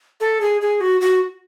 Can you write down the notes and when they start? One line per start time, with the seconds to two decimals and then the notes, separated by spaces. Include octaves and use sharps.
0.21 A4
0.41 G#4
0.61 G#4
0.81 F#4
1.01 F#4